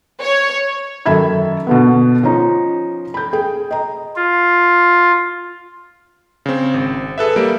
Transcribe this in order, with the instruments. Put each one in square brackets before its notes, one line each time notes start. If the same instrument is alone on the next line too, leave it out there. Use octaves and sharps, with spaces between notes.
[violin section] C#5
[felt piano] F#2 D#3 A4 E5 B5 G#6
B2 D3 B3
F3 C#4 D#4
B5 G6
G#4 G5
D#5 A#5
[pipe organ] F4
[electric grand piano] C#3 C4
G#1
G#4 A4 B4 E5
G3 A#3 D7